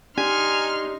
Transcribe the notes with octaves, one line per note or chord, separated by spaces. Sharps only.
D4 D#4 G4 G#5 C6 F6